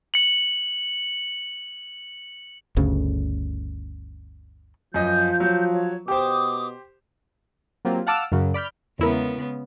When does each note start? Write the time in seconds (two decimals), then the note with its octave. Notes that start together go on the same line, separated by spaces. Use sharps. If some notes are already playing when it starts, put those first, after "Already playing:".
0.14 C#7 F#7
2.77 G1 D2 C#3
4.94 F#2 F3 D#5 G6
5.40 F#3
5.73 C#5
6.08 B2 G4 C5 D6 D#6
7.85 F#3 A#3 C4 F4 G4
8.07 F5 F#5 A5 D6 E6 F6
8.32 F#2 C#3 F#3
8.54 D5 B5 F6 G6
8.99 E2 C#3 G#3 B3 E4 A#4